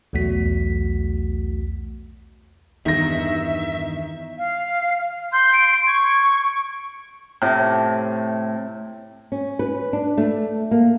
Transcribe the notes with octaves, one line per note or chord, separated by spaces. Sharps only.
B1 E2 A3 F#4 B6
E2 G2 D#3 E5 A#6
F5
C6 G6
D7
C#6 G#6
A2 C3
C#4
B4
D4
A3
A#3